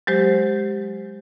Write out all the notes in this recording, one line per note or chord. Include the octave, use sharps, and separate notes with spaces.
F#3 G#3 G4 C5